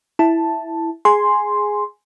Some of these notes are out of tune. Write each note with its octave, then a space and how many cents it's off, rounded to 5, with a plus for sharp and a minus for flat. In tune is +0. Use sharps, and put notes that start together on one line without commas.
E4 +0 A5 +0
G#4 +0 G#5 +0 C6 +0